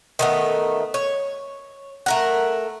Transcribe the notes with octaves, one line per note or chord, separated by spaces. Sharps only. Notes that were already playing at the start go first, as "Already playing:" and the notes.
D#3 A3 B3
C#5
A3 A#4 F#5